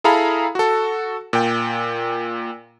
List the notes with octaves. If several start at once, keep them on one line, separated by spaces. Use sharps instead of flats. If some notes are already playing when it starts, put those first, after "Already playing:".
E4 G#4 A4 F5 A#5 B5
F#4 A4
A#2 G5